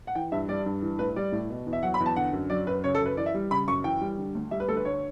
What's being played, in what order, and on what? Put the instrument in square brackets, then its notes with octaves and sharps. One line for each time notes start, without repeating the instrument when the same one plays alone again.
[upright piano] F#5
E3 G5
G2 E5
G3 D5
G2
E3
A2 B4
G3 D5
A2
B2
E2
E5
F#3 F#5
B5
E2
A5
D3 F#5
F#2
F#3 D5
F#2 B4
C#3 C#5
A4
F#2
B4
E3 D5
E5
G3
C#3 B5
F#2 C#6
E3 G5
G3
D3
D2
G3 E5
B4
D2 A4
B4
D3 C#5